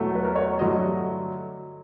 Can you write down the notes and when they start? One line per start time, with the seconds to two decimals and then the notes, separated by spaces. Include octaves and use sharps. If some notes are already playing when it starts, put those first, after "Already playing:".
Already playing: E2 B2 F#3 A3
0.15 B4
0.24 A#4
0.35 C#5
0.59 G2 D3 F#3 A3 D#5